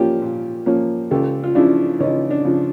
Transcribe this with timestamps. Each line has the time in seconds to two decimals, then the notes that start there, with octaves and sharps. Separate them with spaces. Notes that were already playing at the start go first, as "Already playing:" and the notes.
Already playing: F3 A#3 C#4 F4 G4
0.22 A#2
0.66 F3 A#3 C#4
1.11 C#2 G4 A4
1.44 F4
1.55 C#3 F3 D4 E4
2.00 C#2 C#4 D#4
2.30 D4
2.45 C#3 F3